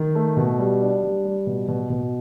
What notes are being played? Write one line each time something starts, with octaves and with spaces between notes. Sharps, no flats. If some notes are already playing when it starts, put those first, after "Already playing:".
Already playing: D#3
A3
B2
G3
D4
G3
G3
B2
B2
B2